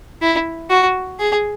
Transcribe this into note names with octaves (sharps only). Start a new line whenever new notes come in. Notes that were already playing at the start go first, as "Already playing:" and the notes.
E4
F#4
G#4